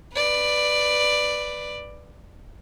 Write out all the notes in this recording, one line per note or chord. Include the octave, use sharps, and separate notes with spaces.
B4 D5